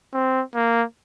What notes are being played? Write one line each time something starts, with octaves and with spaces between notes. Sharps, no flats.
C4
A#3